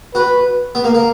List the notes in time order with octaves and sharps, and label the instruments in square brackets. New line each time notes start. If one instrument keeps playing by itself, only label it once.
[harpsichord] F#4 [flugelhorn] B4
[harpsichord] B3
A#3
A#3